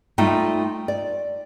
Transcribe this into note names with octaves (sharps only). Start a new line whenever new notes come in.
G3 A3 D#4 F4 G5
D5